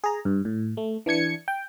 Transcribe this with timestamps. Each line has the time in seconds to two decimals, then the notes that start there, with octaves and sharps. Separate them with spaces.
0.04 G#4 A#5
0.25 G2
0.45 A2
0.77 A3
1.06 E3 D4 G#6 C#7
1.48 G5